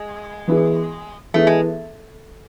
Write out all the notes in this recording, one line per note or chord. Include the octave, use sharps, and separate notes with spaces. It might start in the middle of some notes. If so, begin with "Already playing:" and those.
Already playing: G#3
E3 B3 E4 G#4
E3 A3 B3 E4 G#4
G#3